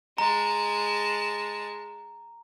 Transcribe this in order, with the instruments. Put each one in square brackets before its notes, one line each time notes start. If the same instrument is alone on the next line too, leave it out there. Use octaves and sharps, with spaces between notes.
[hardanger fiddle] G#3 A5 [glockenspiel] A#5